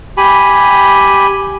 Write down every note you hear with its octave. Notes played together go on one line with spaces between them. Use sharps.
G4 G#5 B5